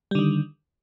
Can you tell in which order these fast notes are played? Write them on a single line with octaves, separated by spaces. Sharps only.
G3 D3 D#3